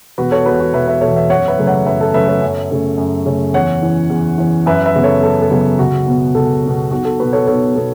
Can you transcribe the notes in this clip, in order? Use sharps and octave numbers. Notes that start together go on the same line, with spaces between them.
E1 F#4 B4
A4 C#5
E2 B2 F#4 B4
F#4
E1 B4 E5
B4 E5
B2 A4 C#5
E2
B4 E5
F#2 C#5 F#5
B4 E5
C#3 F#3 A3 C#4
C#5 F#5
F#2 B4 E5
A4
C#3 F#3 A3 C#4 B4 E5
A4 C#5
F#2
C#3 A3 C#4
F#2
C#3 A3 C#4
E2 C#5 F#5
E3 C#4
E2
E3 C#4
F#2 B4 E5
B4 E5
C#3 F#3 B3
A4 C#5
F#2 A4
A4
C#3 F#3 B3
C#2 F#4
B2 B3
C#2 A4
B2 B3
B1 F#4
A4
B2 B3 F#4 B4
A4 C#5
B1 A4 C#5
B2 B3 A4